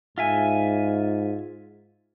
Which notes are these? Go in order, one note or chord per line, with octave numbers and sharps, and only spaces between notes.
G#2 F4 E5 G#5